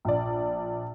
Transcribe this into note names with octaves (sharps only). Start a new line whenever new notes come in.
A#1 D5